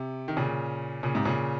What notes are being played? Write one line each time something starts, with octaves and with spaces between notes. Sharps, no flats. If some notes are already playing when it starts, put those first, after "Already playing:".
Already playing: C3
D#3
A#2 C#3
A#2 C#3
G#2 C3
A#2 C#3